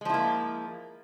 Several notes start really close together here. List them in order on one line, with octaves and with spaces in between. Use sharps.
G#3 F3 E4 A#3